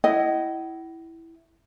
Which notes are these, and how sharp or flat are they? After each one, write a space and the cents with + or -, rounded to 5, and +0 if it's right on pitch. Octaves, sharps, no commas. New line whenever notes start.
E4 +0 D#5 +0 F#5 +45